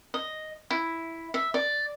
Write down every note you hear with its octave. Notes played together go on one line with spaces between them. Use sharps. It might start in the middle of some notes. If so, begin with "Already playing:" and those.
D#5
E4
E5
D5